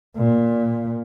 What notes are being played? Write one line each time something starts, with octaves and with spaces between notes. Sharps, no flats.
A#2